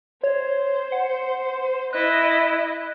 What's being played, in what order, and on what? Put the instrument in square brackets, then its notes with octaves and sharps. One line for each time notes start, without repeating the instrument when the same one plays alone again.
[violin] C5 [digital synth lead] C#5
[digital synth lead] F#5
[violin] E4 D#5 [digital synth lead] F#6